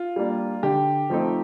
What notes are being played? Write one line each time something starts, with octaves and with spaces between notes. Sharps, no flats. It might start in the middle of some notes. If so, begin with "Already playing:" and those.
Already playing: F4
G3 A#3 D4
D3 G4
F3 A3 C4 D#4